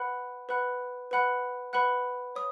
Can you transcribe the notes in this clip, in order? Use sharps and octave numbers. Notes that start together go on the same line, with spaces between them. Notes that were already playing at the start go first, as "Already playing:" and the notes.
Already playing: B4 F#5 B5 F#6
B4 F#5 B5 F#6
B4 F#5 B5 F#6
B4 F#5 B5 F#6
C#5 D#6